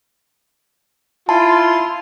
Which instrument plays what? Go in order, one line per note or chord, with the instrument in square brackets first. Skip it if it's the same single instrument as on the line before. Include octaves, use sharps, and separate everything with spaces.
[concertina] E4 C6 [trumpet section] F4 [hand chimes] A5